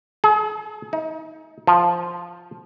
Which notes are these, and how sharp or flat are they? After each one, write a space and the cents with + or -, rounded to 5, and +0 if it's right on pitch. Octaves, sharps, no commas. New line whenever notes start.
G#4 +40
D#4 +30
F3 +0